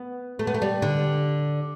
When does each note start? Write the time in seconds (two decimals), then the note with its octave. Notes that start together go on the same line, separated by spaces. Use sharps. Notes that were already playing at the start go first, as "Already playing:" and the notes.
Already playing: B3
0.39 A3
0.47 B3
0.54 A3
0.62 G3
0.82 D3